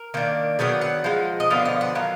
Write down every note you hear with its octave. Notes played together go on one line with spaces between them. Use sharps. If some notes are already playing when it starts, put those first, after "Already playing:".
Already playing: A#4
D#3 A#3 D4
D#3 F#3 B3 D4 G#4
F#5
F3 G#3 D#4
D#5
D3 F3 B3 D4 F5
D#5
F#5
D#3 F#3 F5